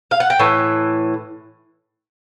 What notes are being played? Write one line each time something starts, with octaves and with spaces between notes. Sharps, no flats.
F5
F#5
G5
A2 E3